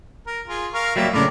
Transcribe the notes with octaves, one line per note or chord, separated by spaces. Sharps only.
A#4
F4 G#4
A#4 F5 C#6
F#3 G3 A#3 E5
A2 C#3 D4 A#4 D5